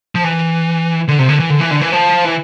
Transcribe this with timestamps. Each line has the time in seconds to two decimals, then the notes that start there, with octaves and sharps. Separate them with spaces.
0.15 F3
0.24 E3
1.08 D3
1.19 C3
1.29 D3
1.39 E3
1.50 D3
1.60 E3
1.71 D3
1.81 E3
1.92 F3
2.25 E3